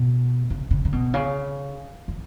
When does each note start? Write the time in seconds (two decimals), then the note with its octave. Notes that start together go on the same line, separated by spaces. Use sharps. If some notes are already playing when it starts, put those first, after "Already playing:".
Already playing: B2
0.50 C#3
0.71 C#3
0.85 C#3
0.92 B2
1.14 C#3
2.08 E3